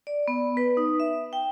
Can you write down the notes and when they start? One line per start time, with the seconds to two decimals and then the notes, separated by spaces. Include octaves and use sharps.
0.07 D5
0.28 B3
0.57 B4
0.77 D#4
1.00 E5
1.33 G5